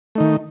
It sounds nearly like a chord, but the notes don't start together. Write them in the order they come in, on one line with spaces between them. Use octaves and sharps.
A3 D#4 D#3